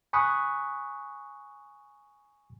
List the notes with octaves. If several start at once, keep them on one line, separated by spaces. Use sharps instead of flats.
G#5 B5 C#6 D#6 F#6